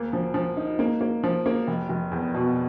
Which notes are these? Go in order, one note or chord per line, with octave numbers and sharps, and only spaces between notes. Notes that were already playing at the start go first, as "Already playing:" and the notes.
Already playing: D2 A#3
F3
F3
D#4
A#3
A#3
F3
A#3
F1
F1
E2
B2